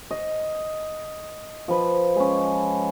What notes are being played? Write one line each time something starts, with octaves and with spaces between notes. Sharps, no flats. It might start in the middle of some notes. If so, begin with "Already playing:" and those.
D#5
F3 B4
G#3 C#4